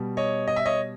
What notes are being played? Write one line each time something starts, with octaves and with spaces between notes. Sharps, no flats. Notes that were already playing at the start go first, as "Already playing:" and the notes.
Already playing: B2 G3
C#5 D#5
D#5
E5
C#5 D#5